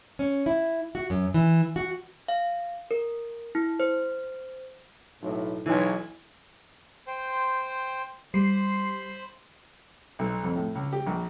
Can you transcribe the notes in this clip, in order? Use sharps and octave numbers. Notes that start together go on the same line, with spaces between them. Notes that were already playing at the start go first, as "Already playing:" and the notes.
C#4
E4
F#4
F#2
E3
F#4
F5
A#4
E4
C5
B1 A2
B1 E3 G#5
C5 G5 C6
G3 C5 B5 C6 C7
B1
F2
A2
C#2
G4
A#1